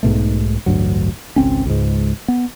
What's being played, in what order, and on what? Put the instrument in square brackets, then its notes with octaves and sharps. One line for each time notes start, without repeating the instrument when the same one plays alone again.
[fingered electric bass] B1 G#2 B2 A3
A1 D2 G2 F#3
G#1 C#2 C4 C#4
C#2 G#2
B3